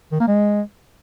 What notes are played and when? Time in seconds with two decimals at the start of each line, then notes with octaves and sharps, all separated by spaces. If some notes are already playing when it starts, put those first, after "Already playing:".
0.12 D#3
0.20 A#3
0.28 G#3